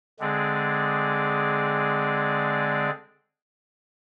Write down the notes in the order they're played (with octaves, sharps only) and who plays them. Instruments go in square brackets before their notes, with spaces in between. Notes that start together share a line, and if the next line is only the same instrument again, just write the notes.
[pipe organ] D3 G#3 C4 G#4 D5